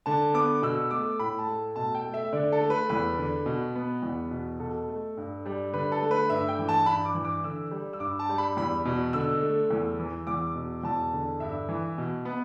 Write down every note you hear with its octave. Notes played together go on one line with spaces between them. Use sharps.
D3 A5
B3 D6
B2 E6
A3 D6
A2 B5
A5
A3
B2 A5
G5
A3
E5
D3 D5
A4
A3
B4
E2 B4
D3
B2
B3
E2
B2
B2 A4
A3
G2
G3
D3 B4
A4
A3
B4
G2 E5
G5
E3
A5
G2 B5
D6
E3
D6
D3 E6
G3
E6
G2 D6
A5
G3
B5
E2 B5
B2
D3 E6
A3
E2
E3
E2 D6
B2
E2 A5
D3
G2 E5
E3
B2
B3